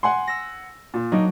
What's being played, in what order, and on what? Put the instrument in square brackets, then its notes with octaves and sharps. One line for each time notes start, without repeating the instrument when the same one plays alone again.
[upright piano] F#5 G#5 C6
[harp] E6 A#6
[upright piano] A#2
[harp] F#3 A#3 D4 [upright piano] D#4